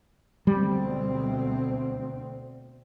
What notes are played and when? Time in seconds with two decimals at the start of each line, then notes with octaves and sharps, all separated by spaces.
0.47 D2 B2 G3 C4